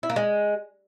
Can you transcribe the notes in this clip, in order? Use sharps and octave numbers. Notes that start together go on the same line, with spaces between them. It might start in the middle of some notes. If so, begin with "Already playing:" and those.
E4
A#3
G#3